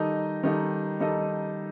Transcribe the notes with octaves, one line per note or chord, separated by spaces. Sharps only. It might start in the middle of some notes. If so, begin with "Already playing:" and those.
Already playing: D#3 G3 D#4 A4 D#5
D#3 G3 D#4 A4 D#5
D#3 G3 D#4 A4 D#5